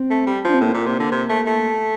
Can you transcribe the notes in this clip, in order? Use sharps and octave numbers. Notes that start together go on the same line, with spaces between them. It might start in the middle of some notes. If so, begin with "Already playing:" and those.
Already playing: C4
A3
G3
F3 D4
C4
A2 A#3
A#2
C3
D3
C3
A3
A3